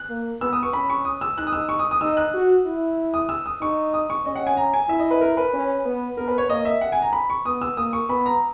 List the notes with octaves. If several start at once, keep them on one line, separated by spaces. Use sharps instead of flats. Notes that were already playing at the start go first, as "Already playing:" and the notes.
Already playing: F#6
A#3
B3 E6
D#6
C#6
C#4 B5
C#6
D#6
E6
D#4 F#6
D#6
E6
C#6
D#6
D#6
D#4 E6
F#6
F#4
E4
D#6
E6
D#6
D#4 C#6
D#6
C#6
C#4 D#5
F#5
G#5
A#5
G#5
E4 E5
D#5
B4
A#4
B4
C#4
B3
B3 A#4
B4
C#5
A#3 D#5
E5
F#5
G#5
A#5
B5
C#6
B3 D#6
E6
A#3 D#6
C#6
B3 B5
A#5